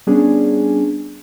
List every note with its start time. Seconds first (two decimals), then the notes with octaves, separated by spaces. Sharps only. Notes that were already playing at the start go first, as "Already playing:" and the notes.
0.07 G3 B3 C#4 D4 G#4